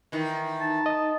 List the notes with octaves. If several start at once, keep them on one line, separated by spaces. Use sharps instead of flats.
D#3 E3
D#4 A5
D#5 D#6